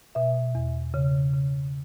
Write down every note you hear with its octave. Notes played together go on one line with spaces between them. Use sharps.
B2 E5
E2
C#3
C#3